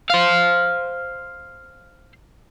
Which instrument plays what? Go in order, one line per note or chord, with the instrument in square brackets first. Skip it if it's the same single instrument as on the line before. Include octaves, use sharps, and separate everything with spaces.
[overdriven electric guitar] C5 F5